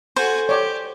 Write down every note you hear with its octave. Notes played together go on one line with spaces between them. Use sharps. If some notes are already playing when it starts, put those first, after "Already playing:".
F#4 A4 C5 G#5
G4 C#5 D5